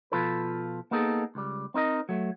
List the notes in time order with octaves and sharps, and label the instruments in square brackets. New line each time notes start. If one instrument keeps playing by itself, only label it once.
[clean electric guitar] B2 F3 F4 A4 B4
A#3 B3 D#4 G#4 A4
C#2 G3
C4 D#4 A#4 D#5
F#3 A3